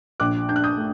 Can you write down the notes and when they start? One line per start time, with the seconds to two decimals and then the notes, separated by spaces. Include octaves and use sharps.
0.20 A#1 D6 F#6
0.48 D4 G6
0.56 F#6
0.64 D#6 G6
0.77 A3